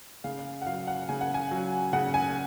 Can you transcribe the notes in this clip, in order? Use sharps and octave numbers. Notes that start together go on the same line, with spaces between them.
C#3 F5
F#5
F#3 F5
F#5
C#3 G#5
F#5
G#5
F#3
C#3 F#5
G#5